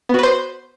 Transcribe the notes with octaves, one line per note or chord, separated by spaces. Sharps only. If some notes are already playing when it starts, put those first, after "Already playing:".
B3 F#4 B4 C5